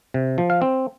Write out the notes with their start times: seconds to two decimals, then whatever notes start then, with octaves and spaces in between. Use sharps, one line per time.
0.14 C3
0.38 F3
0.50 F5
0.62 C4